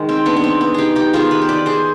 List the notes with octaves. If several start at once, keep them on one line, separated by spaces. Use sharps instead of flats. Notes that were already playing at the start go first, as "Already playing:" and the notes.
Already playing: D#3 G#3
C4
B3 D4
B3
C4
B3
D#4 G4 G#4
D#4 G4
D#3 B3 F4 G#4
G4 B4
C5
B4 D5
G#4 C5